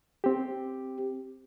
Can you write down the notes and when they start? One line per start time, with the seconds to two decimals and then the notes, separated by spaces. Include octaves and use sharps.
0.24 C4 G4